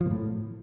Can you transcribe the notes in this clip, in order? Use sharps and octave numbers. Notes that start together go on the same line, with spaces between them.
F3
A#2
A2